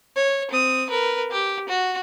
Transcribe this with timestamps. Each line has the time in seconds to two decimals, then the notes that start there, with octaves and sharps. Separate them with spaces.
0.16 C#5
0.51 C4 D#6
0.90 A#4 B4
1.31 G4
1.69 F#4